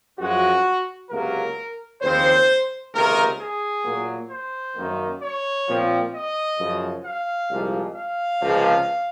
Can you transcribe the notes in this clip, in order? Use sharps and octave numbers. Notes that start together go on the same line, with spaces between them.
F#2 F3 G#3 F#4
C#2 C3 F#3 A#3 A#4
D#2 C#3 F3 C4 C5
C#2 C3 D#3 A#3 A#4
G#4
A#2 F#3 A#3
C5
F#2 D#3 A#3
C#5
A#2 F3 C4
D#5
F#2 C#3 F3
F5
C2 A#2 F3 G#3
F5
C#2 C3 F3 G#3